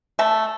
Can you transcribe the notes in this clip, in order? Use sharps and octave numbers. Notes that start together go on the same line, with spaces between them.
A3 A5